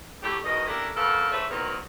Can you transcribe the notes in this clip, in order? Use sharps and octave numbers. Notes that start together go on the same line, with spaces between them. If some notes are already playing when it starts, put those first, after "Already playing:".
A2 F#3 A3 G4
E2 B2 D#3 D#5
A#3 C#4 D4 E4 G4 A4
F2 C#3 B3 A4 A#4 F5
G#2 A3 A4 B4 C#5 E5
E2 G#2 D#3 F#3 A#3 B3